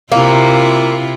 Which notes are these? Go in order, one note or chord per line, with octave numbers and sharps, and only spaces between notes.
C3 A#3 E4 F4